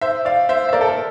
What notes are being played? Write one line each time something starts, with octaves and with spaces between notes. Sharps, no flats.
C5 E5
D5 F5
C5 E5
E5
A#4 D5
A4
A#4